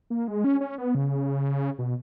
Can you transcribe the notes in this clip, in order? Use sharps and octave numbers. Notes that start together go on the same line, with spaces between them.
A#3
G#3
C#4
C#4
B3
C#3
B2